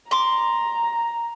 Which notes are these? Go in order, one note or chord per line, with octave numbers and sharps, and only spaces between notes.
A#5 C6 D6